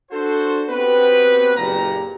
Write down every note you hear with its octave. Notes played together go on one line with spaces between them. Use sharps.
D4 F#4 A4 C5
B3 C4 F#4 G4 B4
F#1 A#2 G4 A#5